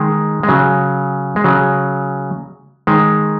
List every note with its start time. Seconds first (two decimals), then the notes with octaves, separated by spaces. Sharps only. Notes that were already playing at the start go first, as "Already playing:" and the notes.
Already playing: D#3 G#3
0.43 G#3
0.49 C#3 F#3
1.36 G#3
1.44 C#3 F#3
2.87 D#3 G#3